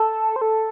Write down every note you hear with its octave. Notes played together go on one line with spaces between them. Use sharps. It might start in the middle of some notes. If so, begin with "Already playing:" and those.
Already playing: A4
C5
A4